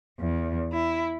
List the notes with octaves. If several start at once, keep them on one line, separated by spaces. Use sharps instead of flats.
E2
E4